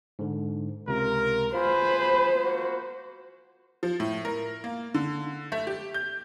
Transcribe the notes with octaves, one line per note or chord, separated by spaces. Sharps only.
G#2 D3
C#2 C3 F4 A#4
F4 G#4 B4 C5 B5
A#3 F#4
F3
A2
A#4
A#3
D3
A3
G4
G6